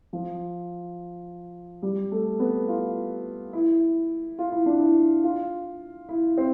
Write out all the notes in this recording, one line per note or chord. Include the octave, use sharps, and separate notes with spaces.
F3
G3
A3
B3
F4
E4
F4
E4
D4
E4
F4
E4
C4